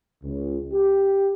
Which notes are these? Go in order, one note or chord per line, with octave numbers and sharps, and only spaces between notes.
C#2
G4